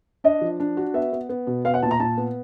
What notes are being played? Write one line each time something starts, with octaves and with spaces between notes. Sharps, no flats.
D4 D#5
F3
D4
F#4
B3 E5
B3
B3
B2
B3 F5
F#5
A#2 A5
A#5
A#2 A5
B3